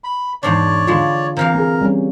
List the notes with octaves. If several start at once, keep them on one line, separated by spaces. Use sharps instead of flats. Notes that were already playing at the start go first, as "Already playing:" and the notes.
B5
E2 G#2 D4 C#5 D5
D3 G#3 F4
C3 E3 A#4 F5
A#3 G#4
G3 C#4